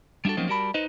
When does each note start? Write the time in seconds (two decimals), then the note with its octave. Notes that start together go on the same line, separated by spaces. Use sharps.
0.25 G3 D4 D#4 F#4 A4
0.37 F3 F#3 A#3 C4 C#4 D#4
0.49 G3 F#4 A#4 A5 B5
0.74 D#4 B4 C5 D#5